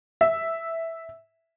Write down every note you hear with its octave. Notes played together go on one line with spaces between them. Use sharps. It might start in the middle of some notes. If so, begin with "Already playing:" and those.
E5